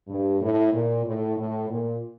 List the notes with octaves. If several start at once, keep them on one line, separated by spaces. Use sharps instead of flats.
G2
A2
A#2
A2
A2
A#2